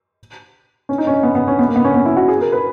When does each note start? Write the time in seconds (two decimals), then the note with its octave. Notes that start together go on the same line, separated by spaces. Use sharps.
0.89 C#4
0.98 D#4
1.07 C#4
1.23 B3
1.35 B3
1.48 C#4
1.59 B3
1.68 A#3
1.76 B3
1.85 C#4
1.94 B3
2.05 E4
2.17 F#4
2.28 G#4
2.41 A#4
2.52 B4